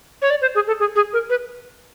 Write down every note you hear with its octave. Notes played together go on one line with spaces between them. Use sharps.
C#5
D5
C5
G#4
A4
G#4
G#4
A#4
B4